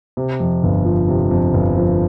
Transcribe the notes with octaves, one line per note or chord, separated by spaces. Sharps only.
C3
F2
G1
F3
C3
F2
G1
F3